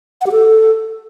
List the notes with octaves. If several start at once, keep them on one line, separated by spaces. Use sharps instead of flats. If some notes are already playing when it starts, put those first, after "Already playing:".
F#5
G4
A4